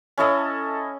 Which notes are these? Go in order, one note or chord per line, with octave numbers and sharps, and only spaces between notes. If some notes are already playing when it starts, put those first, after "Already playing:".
C#4 E4 A4 D#5